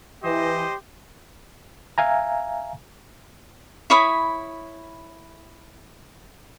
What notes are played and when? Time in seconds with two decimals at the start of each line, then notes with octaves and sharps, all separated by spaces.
0.23 E3 G4 C5 D#5
1.98 E5 F5 G#5 A#5
3.90 E4 C#5 B5 D#6